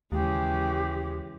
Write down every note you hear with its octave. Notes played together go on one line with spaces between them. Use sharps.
D#2 C#3 E3 G#3 G4